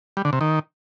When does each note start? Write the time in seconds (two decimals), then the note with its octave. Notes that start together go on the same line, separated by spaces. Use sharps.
0.17 G3
0.25 D3
0.33 C3
0.41 D#3